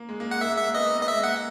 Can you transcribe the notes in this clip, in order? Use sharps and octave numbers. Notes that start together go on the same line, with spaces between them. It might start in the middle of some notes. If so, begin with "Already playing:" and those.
Already playing: A#3
G#3
A#3
G#3 F#5
A#3 E5
G#3
E5
A#3
B3 D#5
A#3
B3
D#5
E5
G#3
A#3 F#5